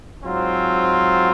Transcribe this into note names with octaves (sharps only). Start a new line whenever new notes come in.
G#2 F#3 C4 F4